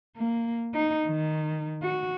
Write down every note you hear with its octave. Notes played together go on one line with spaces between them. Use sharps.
A#3
D#4
D#3
F#4